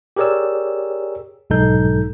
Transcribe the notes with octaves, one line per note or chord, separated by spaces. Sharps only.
G4 G#4 A#4 C#5 D5 E6
B1 G#2 G#3 D#4 A4 G6